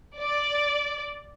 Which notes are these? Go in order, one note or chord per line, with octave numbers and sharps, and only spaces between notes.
D5